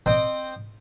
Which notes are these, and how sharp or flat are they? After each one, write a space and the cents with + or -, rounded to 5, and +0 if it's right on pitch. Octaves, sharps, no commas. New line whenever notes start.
C4 +0 D#5 -25 G5 +0